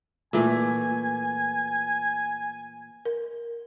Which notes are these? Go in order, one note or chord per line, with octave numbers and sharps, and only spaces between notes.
A#2 E3 A3 G#5
A#4